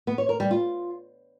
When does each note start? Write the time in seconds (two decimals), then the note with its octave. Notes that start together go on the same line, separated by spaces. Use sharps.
0.07 B3
0.18 C#5
0.29 A#4
0.40 G3
0.51 F4